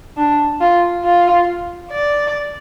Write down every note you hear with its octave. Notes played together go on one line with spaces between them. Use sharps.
D4
F4
F4
D5